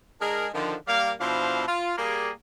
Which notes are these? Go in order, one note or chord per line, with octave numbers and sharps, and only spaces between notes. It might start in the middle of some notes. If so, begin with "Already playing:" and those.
G#3 D4 G#4 A#4
D3 D#3 F3
G3 A#3 G4 A#4 F5
B2 F3 D4 E4 C5 F5
F4
G3 A#3 G#4